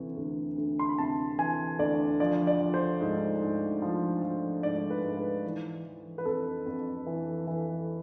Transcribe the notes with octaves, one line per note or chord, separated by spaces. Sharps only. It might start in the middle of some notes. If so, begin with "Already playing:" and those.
Already playing: D2 C3 E3
D2
D2
C6
B5
C3 A5
E3 G#5
D2 D5
F3 D5
D5
F3
C5
G#2
G#2
F3
F3
G#2 D5
B4
G#2
B4
E3
E3
B4
F2 A4
F2
E3
E3